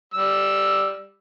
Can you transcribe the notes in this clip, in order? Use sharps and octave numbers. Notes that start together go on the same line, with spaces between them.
G3 E6